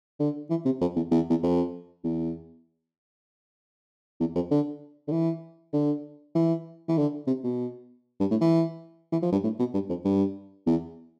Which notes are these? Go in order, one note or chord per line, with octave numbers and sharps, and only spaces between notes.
D3
E3
C3
F2
E2
E2
E2
F2
E2
E2
F2
D3
D3
E3
D3
E3
E3
D3
C3
B2
G2
A2
E3
E3
F3
G2
A2
B2
G2
F2
G2
E2